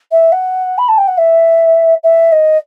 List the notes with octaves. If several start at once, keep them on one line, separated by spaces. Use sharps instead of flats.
E5
F#5
B5
A5
G5
F#5
E5
E5
D#5